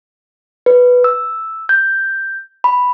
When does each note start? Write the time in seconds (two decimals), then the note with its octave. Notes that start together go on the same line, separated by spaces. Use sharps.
0.66 B4
1.04 E6
1.69 G6
2.64 B5